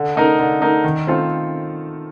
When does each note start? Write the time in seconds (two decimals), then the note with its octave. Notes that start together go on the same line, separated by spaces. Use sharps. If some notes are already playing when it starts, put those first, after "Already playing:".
Already playing: D3
0.15 A3 D#4 A#4
0.39 D3
0.61 A3 D#4 A#4
0.84 D#3
1.07 A3 C4 F4 A4